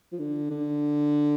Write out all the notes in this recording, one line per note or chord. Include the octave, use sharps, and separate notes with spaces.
F3
D3
D3